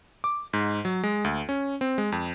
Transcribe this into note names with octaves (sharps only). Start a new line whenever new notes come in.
D6
G#2
F#3
G#3
D2
C#4
C4
G#3
F2